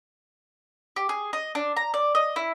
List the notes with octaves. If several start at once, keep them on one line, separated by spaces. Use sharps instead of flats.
G4
G#4
D#5
D4
A#5
D5
D#5
E4